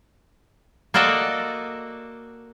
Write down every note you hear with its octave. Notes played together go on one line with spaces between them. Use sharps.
A#3 F#4 A4 D5 D#5 A5